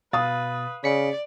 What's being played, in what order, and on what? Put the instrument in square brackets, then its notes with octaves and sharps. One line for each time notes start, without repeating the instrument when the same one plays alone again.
[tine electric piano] B2 A6 [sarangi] B4 [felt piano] F5 D#6
[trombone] C#3 [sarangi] D5 [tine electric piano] B6 C#7